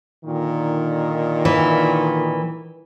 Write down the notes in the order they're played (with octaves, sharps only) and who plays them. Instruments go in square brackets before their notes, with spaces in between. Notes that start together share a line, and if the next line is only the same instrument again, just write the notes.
[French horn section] A#2 D3 D#3
[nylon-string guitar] E3